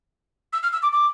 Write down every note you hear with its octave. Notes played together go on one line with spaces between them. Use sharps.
E6
F6
E6
D6
D6